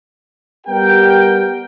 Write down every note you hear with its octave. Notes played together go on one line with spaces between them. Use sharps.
G3 B3 G4 A#4 G5